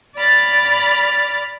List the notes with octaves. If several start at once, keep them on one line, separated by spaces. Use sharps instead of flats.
D5 B5 F6 A6